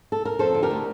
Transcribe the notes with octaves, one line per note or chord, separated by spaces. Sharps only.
A4
A#4
F2 A4 C5
D3
G4 A#4
A3